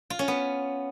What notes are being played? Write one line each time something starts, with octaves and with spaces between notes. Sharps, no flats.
F4
C#4
B3